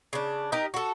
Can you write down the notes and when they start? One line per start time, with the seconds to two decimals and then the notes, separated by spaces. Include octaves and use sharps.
0.13 C#3 D4
0.52 D#4 G4 A#4 D#5
0.74 F#4 A4